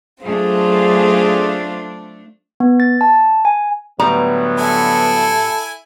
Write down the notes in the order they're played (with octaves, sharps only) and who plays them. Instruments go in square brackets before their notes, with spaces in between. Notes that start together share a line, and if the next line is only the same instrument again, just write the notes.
[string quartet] F#3 C4 F4 [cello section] A3 D4 [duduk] G#4
[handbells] B3
A6
A5
G#5
[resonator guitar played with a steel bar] A2 G3 A#5 [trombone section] D3 F#3 B3
[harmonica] E4 G#5 [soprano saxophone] A4